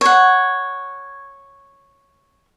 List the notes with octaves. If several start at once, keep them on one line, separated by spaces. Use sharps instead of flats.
C#5 F#5